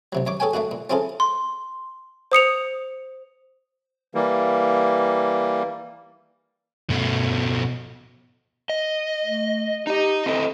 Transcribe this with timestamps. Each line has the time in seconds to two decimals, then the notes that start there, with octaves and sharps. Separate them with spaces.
0.13 C2 C3 F#3
0.27 F#2 C#5 D6
0.40 G#4 A4 C#5 G5 G#5
0.53 A3 A#3 D#4 F#4
0.71 A#2
0.90 C4 C#4 E4 F4 G#4 A4
1.20 C6
2.32 C5 D#6 C#7 F7
4.15 E3 G3 A#3
6.91 B2 A3
8.70 D#5
9.24 A3
9.87 D#4 G4 D#5
10.26 C4 E4 A4 D#5